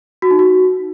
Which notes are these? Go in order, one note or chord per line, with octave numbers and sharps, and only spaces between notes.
F#4
D#4
F#4